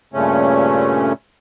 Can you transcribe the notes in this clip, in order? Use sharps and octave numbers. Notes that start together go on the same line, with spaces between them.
G2 A#2 C#3 A3 C#4